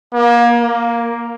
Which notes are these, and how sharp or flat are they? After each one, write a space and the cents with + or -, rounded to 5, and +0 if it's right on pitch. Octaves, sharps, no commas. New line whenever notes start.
A#3 +30
A#3 +5